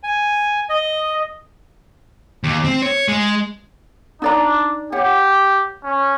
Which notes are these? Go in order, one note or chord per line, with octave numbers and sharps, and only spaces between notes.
G#5
D#5
D#2
C4
C#5
G#3
D4 D#4 D5 A#5
G4 C#5 F#5
C#4